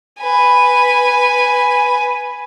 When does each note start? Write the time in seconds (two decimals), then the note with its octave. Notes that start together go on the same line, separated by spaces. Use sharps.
0.21 B4 G#5